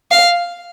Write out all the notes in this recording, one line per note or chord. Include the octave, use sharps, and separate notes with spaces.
F5